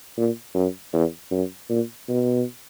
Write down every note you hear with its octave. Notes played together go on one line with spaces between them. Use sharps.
A#2
F#2
E2
F#2
A#2
B2